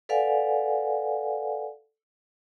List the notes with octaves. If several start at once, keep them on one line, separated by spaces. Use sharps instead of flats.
A4 B4 D5 F5 F#5 G#5